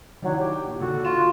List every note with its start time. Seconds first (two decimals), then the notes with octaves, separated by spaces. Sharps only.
0.22 D#3 E3 F#3 D4
0.39 G4
0.52 G5
0.65 A#2
0.80 D#2 D3 F#4 A4
1.05 F4 E7